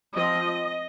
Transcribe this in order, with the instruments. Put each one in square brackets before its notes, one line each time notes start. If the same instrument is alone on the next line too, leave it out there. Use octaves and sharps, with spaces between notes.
[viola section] F3 C4 D#5